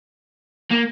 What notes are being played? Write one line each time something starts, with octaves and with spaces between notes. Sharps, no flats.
A#3